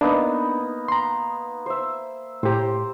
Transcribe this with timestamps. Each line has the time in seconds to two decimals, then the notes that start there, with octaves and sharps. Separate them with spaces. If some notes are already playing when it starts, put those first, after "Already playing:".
0.01 A#3 B3 D4 D#4
0.88 A#5 C6
1.66 C5 E5
2.43 A2 G4 C5 A#5